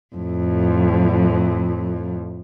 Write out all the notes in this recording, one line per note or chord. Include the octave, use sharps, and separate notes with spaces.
F2 A2